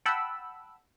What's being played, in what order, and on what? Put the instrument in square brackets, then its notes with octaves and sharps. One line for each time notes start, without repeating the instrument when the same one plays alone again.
[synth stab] F#5 G5 A5 B5 E6